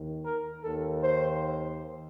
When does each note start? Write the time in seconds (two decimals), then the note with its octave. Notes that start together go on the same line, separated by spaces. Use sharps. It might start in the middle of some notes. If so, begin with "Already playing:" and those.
Already playing: D#2 D#3
0.25 A#4
0.64 D#2 D#3 A4
1.03 C5